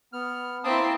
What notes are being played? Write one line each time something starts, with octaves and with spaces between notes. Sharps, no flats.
B3 F6
A#3 C4 E4 A5 D#6